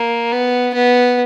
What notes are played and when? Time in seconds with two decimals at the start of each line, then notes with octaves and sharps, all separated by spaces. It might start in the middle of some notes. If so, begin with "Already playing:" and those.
Already playing: A#3
0.32 B3
0.74 B3